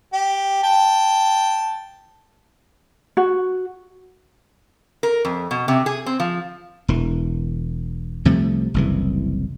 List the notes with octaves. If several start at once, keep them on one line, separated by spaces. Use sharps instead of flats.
G4
G5 A5
F#4
A#4
F2
B2
C3
G#4
C4
F3
E1 E3
C2 C3 F3 A3
F#1 C2 E3